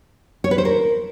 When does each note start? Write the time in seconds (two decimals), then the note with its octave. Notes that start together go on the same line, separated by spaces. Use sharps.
0.44 C#5
0.51 B4
0.58 C5
0.65 A#4